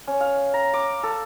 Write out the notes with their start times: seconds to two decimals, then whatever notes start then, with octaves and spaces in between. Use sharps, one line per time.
0.08 C#4
0.21 F5
0.54 A#5
0.74 D6
1.03 A4